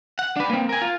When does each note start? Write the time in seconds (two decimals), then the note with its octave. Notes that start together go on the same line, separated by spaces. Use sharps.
0.19 F#5
0.36 D4 B4
0.50 A#3 C4
0.69 A#4 G#5
0.81 F4